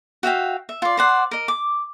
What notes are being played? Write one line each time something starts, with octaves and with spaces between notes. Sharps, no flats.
F#4 E5 F5 G5
E5
F4 D5
C5 D5 F#5
A#4 D#5
D6